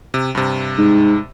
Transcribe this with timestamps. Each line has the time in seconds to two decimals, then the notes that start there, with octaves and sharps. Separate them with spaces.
0.14 C3
0.35 G2 C3
0.78 G#2